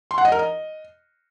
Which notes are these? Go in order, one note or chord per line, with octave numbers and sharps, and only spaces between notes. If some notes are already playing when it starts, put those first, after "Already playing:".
C6
F#5
D#5
A#4
D#5